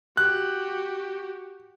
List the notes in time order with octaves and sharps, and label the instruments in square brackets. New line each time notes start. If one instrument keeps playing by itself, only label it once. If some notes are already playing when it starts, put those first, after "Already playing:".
[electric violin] F#4 G4 [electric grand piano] F#6